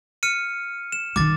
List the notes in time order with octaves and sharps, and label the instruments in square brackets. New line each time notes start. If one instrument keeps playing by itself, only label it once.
[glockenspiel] F6 C#7 D#7
E7
[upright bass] D#3 E3 [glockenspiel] D6 A6